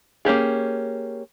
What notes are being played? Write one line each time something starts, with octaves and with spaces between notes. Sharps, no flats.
A#3 C#4 G4 G#4